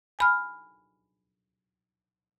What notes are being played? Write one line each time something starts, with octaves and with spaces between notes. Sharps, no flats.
G#5 B5 F6